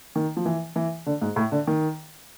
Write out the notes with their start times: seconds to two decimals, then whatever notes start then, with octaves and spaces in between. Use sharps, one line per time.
0.16 D#3
0.37 F3
0.45 E3
0.76 E3
1.06 D3
1.22 G#2
1.36 A2
1.52 D3
1.67 D#3